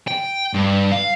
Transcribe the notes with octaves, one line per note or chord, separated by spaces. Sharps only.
G5
G2
F5